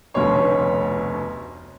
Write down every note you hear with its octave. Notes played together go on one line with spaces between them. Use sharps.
F1 D2 B2 C#4 C#5 C6